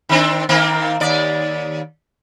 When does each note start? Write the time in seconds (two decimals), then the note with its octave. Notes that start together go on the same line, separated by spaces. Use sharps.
0.09 D#3 C4 D4
0.49 D#3 A#3 C4
1.00 D#2 D5